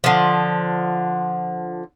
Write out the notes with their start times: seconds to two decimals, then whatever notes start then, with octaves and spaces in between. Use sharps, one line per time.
0.04 D3 F3